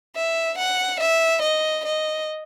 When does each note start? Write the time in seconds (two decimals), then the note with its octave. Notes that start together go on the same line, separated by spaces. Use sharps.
0.15 E5
0.58 F#5
1.00 E5
1.42 D#5
1.85 D#5